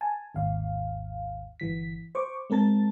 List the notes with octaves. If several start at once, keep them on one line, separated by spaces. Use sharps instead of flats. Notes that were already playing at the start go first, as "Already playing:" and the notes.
G#5 A5
G#1 D#2 F5
G1 E3 B6
C5 C#6 D6
G#3 C4 A#4 A5 A6